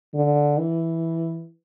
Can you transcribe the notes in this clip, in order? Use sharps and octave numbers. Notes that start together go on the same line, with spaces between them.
D3
E3